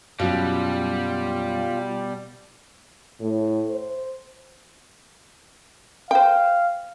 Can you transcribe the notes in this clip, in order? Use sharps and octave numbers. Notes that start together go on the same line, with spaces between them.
F#2 B2 G3 F4
A2
C5
C5 F5 G5